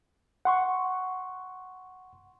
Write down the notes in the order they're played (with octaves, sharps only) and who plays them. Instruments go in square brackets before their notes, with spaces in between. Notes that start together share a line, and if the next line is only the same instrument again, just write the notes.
[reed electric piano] F#5 C6 C#6